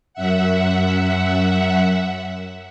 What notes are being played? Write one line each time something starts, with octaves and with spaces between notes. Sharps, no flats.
F#2 E5 F#5